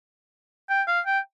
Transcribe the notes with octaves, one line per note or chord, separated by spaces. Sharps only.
G5
F5
G5